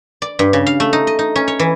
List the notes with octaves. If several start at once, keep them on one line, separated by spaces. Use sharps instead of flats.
D5
G2
C#3
F5
A3
D#4
D#5
D#4
C#4
C#5
E3